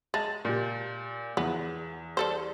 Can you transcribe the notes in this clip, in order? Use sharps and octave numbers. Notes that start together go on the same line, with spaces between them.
G#3 A5 A6
A#2 G4
E2 B3
G3 A4 C5